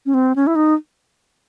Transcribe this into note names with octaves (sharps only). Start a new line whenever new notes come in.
C#4
C4
C#4
E4
D#4